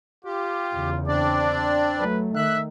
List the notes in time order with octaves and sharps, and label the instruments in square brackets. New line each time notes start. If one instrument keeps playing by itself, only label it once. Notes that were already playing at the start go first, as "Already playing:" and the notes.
[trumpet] F4 [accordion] G4
[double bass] E2 C#3
[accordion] C4 D4 D5 [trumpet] D6
[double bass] F#3 A3 [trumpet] B4
[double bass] D#3 [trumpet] E5 [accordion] F#6